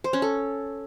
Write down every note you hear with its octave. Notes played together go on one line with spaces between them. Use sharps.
C5
C#4
A4